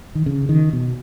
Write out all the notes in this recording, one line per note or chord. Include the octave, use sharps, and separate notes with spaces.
D#3
C#3
D#3
B2